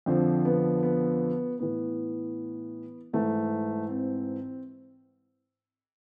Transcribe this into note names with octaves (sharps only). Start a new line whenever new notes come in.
F2 D3 F3 C4
B3
B3
A2 E3 B3
G#2 E3 A3
C4